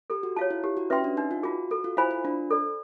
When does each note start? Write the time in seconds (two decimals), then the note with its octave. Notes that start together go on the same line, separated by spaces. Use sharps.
0.10 G4 A4
0.23 F#4
0.36 F4 C#5 F5 A5
0.51 E4
0.64 E4 G4
0.77 F#4
0.90 C#4 B4 E5 G5 C6
1.04 D4
1.17 D4 D#4
1.31 F4
1.43 F4 F#4 G#4
1.71 F#4 A4
1.84 F4
1.97 E4 C5 F5 G#5 B5
2.11 F4
2.25 D4 F4
2.51 A4 D5